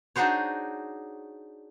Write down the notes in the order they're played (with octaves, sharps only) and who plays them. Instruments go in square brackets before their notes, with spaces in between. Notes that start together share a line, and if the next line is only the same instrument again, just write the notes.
[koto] D4 D#4 F#4 G#4 C5 C#5